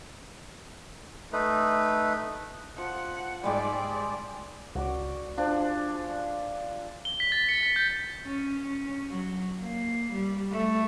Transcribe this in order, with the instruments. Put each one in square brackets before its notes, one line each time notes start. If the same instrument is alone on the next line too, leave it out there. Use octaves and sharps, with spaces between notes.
[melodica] A3 D#4 B4
[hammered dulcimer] F3 [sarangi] F#5
[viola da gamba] G#2 [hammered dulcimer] G3 G#3 G4 [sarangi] D5
[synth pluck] C#2 [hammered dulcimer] F#4 D5
[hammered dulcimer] F3 D4 G#4
[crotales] G7
B6
A6
C#7
B6
G6
[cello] C#4
C#4
F#3
A#3
G3
A3